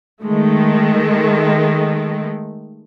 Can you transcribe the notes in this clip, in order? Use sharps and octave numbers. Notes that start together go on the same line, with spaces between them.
D#3 G#3 A3